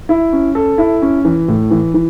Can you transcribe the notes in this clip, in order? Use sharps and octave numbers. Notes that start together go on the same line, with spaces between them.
E4
C#4
A4
E4
C#4
E3
A2
E3
E3